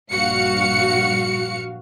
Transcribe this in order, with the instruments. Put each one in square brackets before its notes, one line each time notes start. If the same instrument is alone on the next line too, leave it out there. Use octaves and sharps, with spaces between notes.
[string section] A#1 G2 F#4 F5 C#7